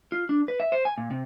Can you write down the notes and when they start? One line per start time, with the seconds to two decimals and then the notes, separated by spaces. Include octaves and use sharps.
0.12 F4
0.29 D4
0.48 B4
0.60 E5
0.72 C5
0.85 G#5
0.98 A#2
1.11 C3